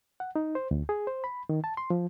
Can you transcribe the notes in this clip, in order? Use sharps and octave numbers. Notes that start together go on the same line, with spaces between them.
F#5
D#4
C5
D2
G#4
C5
B5
D#3
A5
C6
F3